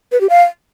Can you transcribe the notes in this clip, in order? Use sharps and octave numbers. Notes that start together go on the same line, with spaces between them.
B4
G4
F5